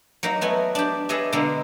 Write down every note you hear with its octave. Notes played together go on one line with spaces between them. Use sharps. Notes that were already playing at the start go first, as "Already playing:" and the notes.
F#3 A#3 D#4
A3 B3 G#5
D4 G4
G#4 A4 B4 C#5 D#5 E5
B2 D3 G#3 A#3 B3